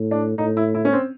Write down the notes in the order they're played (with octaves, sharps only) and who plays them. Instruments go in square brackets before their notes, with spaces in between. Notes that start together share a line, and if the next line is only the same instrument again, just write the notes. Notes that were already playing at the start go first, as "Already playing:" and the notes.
Already playing: [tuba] A2
[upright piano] D4
[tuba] A2 [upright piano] D#4
[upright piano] E4
E4
C#4
C4